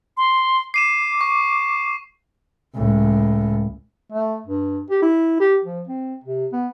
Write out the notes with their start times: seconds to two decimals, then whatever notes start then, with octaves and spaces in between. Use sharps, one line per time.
0.17 C6
0.74 D6 C7 D#7 E7
1.21 C#6
2.75 C#2 A2
4.12 A3
4.46 G2
4.90 G4
5.02 E4
5.40 G4
5.64 F3
5.88 C4
6.24 C3
6.53 B3